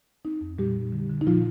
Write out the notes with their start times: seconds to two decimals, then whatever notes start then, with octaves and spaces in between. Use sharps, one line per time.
0.25 C4 D#4
0.41 F2
0.58 A#2 G3 G4
0.76 A#2
0.92 D3
1.10 D3
1.21 D#4
1.27 A#2 F3 F4